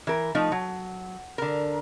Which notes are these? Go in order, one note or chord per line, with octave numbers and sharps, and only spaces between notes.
E3 A#4
F3 A3 D#4
F#3
D3 A#4